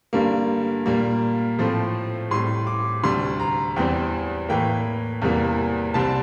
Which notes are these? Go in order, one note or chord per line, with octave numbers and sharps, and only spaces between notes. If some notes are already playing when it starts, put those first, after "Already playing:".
G2 D3 G3 A#3
A#2 G3 A#3
A2 F3 A3 C4
A2 G3 C4 C6
D6
D2 C3 G3 C6
A#5
E2 E3 G3 C4 G5
A2 E3 A#3 G5
E2 C3 E3 G3 A#3
C2 C3 G3 C4 A5